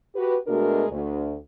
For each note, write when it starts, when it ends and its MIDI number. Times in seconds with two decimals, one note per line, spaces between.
0.15 0.35 66
0.15 0.35 67
0.15 0.35 71
0.47 0.84 47
0.47 0.84 56
0.47 0.84 57
0.47 0.84 62
0.47 0.84 66
0.47 0.84 70
0.89 1.35 38